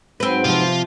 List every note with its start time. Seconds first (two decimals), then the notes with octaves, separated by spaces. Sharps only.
0.20 G#2 F#3 C4 B4
0.44 C3 F3 F4